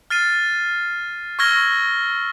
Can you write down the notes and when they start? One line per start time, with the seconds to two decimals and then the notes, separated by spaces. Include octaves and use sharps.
0.10 F6 A6 C7 D#7
1.39 C#6 E6 F6 G#6 A#6 G7